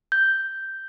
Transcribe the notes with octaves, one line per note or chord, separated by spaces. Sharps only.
G6